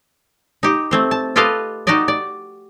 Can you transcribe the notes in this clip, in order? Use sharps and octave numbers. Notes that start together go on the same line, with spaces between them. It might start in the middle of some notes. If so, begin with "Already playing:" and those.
D#4 G4
A3 C4 C5
A5
F4 G4 A4 B4 D#5 F5
D#4 F#4 G4 D5 D#5
D5